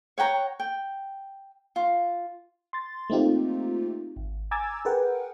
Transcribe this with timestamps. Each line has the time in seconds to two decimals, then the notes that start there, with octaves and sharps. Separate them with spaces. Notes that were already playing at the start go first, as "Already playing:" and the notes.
0.18 C#5 F#5 G5 A#5
0.60 G5
1.76 F4
2.73 C6 A6
3.10 A3 A#3 C4 D#4 F4 G4
4.17 G#1
4.51 G#5 A#5 D6 E6 G#6 A6
4.85 G#4 A#4 B4 F#5 G5